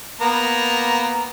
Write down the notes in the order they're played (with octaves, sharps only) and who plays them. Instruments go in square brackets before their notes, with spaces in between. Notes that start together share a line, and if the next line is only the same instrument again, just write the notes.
[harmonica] A#3 B3 A#5